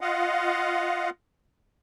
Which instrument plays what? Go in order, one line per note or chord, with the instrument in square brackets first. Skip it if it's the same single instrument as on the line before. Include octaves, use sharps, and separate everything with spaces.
[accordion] F4 D#5 F5 F#5